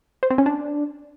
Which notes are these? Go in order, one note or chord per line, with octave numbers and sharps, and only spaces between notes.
C5
C4
C#4
D4